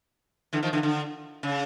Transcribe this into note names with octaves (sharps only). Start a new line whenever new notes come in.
D3 E3
D#3 F3
D3 E3
D3
C#3